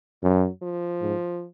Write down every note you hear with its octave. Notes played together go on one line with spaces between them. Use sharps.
F#2 F#3
F3
G#2